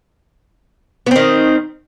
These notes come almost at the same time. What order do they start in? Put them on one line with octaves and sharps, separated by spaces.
B3 C4 D#3